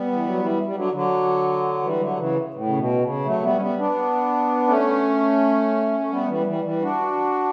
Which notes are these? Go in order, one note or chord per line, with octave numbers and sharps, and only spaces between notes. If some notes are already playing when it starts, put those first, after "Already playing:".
Already playing: G3 B3
E3
F#3
E3 G3
G3
D3 F#3
D3 F#3
E3 G3
D3 F#3
C#3 E3
A2
C#3
B2
C#3
F#3 A3
G3 B3
C#4
G3 B3
B3 D4
A3 C#4
A3
G3 B3
A3
E3 G3
E3 G3
E3 G3
D4 F#4